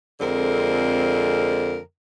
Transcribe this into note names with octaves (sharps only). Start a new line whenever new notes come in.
F2 D3 G#3 C4 A#4